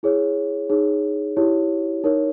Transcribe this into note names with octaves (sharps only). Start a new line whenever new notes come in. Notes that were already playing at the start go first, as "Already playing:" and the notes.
E4 G#4 C#5
D#4 G#4 C#5
E4 G4 C#5
D#4 A#4 C#5